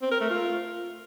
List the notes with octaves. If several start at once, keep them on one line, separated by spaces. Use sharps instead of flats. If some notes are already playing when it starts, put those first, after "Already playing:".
C4
A#4
A3
F4